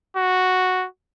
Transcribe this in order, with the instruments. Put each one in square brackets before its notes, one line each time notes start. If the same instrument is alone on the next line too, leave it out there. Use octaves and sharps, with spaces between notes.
[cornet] F#4